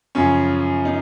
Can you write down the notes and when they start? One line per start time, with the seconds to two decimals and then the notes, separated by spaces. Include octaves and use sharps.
0.15 F#2 C#3 F3 C#4
0.85 D#4